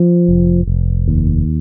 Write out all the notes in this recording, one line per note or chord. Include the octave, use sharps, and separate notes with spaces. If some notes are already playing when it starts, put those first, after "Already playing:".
Already playing: F3
F1
F1
D#2